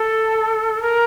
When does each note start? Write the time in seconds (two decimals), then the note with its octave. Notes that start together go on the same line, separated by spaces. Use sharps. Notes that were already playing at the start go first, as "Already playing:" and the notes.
Already playing: A4
0.82 A#4